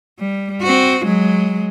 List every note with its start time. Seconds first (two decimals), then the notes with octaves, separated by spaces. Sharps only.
0.19 G3
0.62 C4 F#4
1.05 F#3 G#3